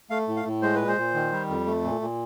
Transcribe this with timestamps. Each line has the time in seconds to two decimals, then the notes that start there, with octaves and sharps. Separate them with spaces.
0.10 A3 F5
0.28 A2
0.36 F5
0.45 A2
0.62 G#3 C5
0.75 A#2 B4
0.88 C5
0.97 A#2
1.14 D#3
1.32 G3
1.49 F2
1.67 A3
1.84 A#2
2.01 A#2